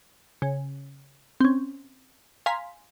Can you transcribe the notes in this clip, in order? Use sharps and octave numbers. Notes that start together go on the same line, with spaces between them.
C#3
C4 C#4
F5 G#5 A#5 C6 B6